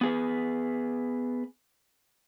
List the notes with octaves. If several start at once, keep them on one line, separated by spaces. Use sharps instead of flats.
B3 G#4 B4